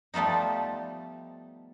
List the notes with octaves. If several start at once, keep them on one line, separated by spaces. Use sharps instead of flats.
F3 G3 A3 B3 D#4